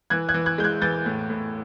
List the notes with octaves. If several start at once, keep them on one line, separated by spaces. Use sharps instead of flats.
E3 F#6 G#6
F#6 G#6
E3
F#6 G#6
G#3 G6
F#6 G#6
E3 G6 A6
A2
A2